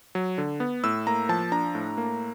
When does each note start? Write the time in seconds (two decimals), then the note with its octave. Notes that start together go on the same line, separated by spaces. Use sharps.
0.15 F#3
0.38 D3
0.60 B3
0.84 A2 E6
1.07 A#3 A#5
1.29 F3 A5
1.52 D4 A#5
1.75 A2
1.97 A#3